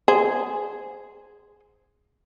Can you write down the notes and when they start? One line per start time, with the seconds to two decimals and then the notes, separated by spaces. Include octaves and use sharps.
0.08 G#4 C5